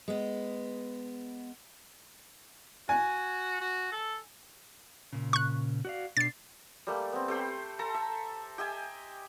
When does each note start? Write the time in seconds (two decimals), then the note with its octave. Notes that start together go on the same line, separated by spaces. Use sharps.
0.08 G#3 B3
2.89 F#4 G#5
3.61 F#4
3.92 A4
5.13 A#2 C#3
5.33 C#6 F#6
5.85 F#4 D5 F5
6.17 B2 D4 A6 C7
6.87 G3 A3 A#3
7.12 B3 C4
7.28 A3 G4 C5 B5
7.79 A4 A5 A#5
7.94 E5
8.58 G4 D#5 E5 G#5